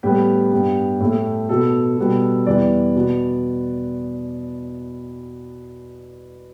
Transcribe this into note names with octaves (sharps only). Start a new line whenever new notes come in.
A2 G3 B3 G4
G2 G3 B3
A2 A3
B2 B3 A4
B2 G3 B3
E2 E3 G3 B3 D5
B2 B3